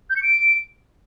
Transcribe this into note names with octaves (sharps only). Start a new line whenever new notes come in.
G6
C#7
D7